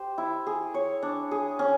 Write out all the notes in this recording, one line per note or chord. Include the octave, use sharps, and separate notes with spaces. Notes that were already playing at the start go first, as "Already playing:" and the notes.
Already playing: G4 C5
E4
G#4
C#5
D4
G#4
C#4